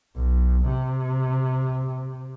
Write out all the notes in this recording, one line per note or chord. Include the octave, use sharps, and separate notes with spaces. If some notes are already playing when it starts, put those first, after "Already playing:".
B1
C3